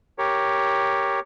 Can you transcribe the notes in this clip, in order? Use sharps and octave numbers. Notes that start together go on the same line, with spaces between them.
G4 A#4 C#5